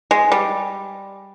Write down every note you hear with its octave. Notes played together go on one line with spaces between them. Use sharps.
G#3
G3